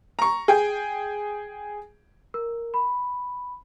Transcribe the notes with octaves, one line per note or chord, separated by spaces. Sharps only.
A#5 C#6
G#4 G5
A#4
B5